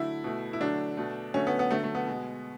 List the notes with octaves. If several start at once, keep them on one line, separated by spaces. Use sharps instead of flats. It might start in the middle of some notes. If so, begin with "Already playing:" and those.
Already playing: D3 F#3 A3 E4
B2 A3
E4
D3 F#3 A3 D4
B2 A3
D3 F#3 A3 C#4
B3
B3
D3 F#3 A3
A3
B3
B2 G#3